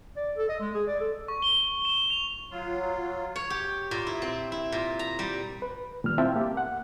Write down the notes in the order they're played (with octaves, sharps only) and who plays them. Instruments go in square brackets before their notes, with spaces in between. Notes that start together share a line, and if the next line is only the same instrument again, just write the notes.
[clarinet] D5
A4
D#5
G#3
G#4
D5
A4
[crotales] C#6
G7
E7
F7
[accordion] F#3 F4
[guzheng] C#5
G4
A#2
E4
C4
E4
A#2
A#5
G3
[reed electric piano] B4
A#2 D#3 G3 F6
C4 E4 F4 E5 G5 A5
A#3 G4
F#5